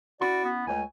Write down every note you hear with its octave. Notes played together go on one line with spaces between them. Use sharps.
C#4 E4 F#4 D5 B5
B3
C#2 G#3 A3 C#5 G#5